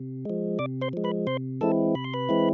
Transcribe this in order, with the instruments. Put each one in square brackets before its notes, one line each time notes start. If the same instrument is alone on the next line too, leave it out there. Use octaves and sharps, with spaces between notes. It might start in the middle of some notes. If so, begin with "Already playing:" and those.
Already playing: [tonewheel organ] C3
F3 G#3
C3 D5 D6
C5 C6
F3 G#3
B4 B5
C3 C5 C6
E3 G#3 C4 E4 A4 A5
C3 B5
C6
B4 B5
E3 G#3 C4 E4